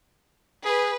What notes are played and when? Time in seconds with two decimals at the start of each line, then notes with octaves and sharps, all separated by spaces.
0.65 G#4 B4